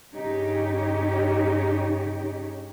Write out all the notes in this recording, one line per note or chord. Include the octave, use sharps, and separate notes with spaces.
G2 C#3 D#4 G4 C#5